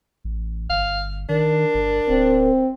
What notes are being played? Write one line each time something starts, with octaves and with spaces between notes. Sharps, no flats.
A1
G1 F5
D#3 D4 A#4
G1
D1 C4